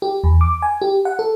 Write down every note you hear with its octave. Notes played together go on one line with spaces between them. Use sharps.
G4
E2
D6
G#5
G4
F#5
A4